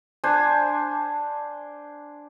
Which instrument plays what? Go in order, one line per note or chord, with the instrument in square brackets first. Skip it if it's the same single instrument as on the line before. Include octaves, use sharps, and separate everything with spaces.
[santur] D4 C5 G#5